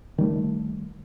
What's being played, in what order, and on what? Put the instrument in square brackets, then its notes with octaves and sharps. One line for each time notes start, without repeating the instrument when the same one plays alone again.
[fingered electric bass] D#3 G3 A3